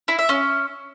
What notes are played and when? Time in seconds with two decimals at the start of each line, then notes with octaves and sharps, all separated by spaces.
0.08 E4
0.19 E5
0.29 C#4